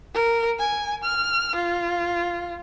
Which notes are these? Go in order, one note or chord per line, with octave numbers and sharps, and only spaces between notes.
A#4
G#5
F6
F4